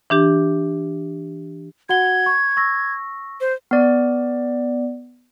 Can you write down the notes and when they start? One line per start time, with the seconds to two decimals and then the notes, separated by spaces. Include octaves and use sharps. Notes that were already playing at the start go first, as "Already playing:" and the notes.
0.10 E3 D4 G4
1.89 F#4 F#5 G#6 G7
2.26 C#6
2.57 C#6 E6 A#6
3.41 C5
3.71 B3 D5